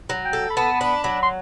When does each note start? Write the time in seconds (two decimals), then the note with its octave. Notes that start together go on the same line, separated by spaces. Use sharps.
0.09 F#3
0.25 G5
0.33 A4
0.50 B5
0.57 B3 A5
0.80 D4 B5
1.04 F#3 B5
1.23 C6